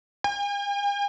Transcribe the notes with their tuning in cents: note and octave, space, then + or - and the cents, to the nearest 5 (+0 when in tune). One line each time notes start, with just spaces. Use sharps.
G#5 -45